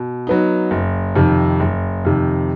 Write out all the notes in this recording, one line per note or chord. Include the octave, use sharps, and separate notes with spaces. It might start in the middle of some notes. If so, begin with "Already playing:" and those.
Already playing: B2
F#3 B3 D#4
F#1
F2 C3 D#3
F#1
F2 C3 D#3